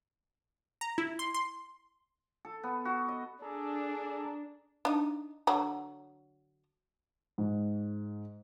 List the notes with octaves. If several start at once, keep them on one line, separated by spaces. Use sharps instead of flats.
A#5
E4
C6
C6
A4
B3
F#4
D#5
D4 G#4 A4 A#5
D4 D#4
D3 F#3 A#5
G#2